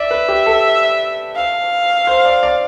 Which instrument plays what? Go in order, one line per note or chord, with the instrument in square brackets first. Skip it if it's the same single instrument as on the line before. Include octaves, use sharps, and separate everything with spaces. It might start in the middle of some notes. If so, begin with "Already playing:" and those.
Already playing: [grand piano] D5 [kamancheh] E5
[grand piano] B4
G4
A4
[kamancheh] F5
[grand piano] C5
D5
D5